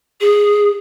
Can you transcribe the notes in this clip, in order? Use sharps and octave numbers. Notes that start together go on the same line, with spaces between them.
G#4